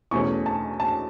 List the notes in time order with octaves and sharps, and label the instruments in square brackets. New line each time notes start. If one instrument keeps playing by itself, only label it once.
[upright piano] E2 B2 A3 C#4 C#6
A5
A5